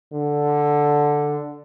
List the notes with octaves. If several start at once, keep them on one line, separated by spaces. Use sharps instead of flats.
D3